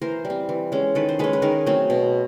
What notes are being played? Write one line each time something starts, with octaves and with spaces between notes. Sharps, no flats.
E3 A#4 C5
G3
C4
E3
G#3 C#4
D#3 A4 B4
C5
G#3 C#4 A4 B4
B4
D#3 G#4 A#4
F#3 A3 C4
B2